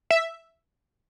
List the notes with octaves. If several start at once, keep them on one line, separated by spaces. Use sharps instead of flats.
E5